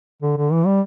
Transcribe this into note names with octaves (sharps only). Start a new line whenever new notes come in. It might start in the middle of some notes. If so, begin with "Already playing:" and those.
D3
D3
E3
G3